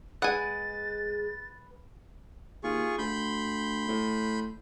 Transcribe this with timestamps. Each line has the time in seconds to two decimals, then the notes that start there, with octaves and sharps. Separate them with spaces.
0.22 G#3 B4 F#5 G#5 A6
2.64 D#2 F4 G#4 C#6
2.98 D2 B5 C6 G6
3.88 A2